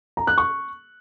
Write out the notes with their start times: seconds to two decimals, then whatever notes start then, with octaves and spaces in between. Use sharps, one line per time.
0.17 A#5
0.27 F#6
0.38 C#6